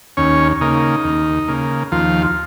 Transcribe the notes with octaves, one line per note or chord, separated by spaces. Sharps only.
D#2 C#4 C#5
C#3 A#3 D#4
D#2
C#3 A#3
D#2 F3 F4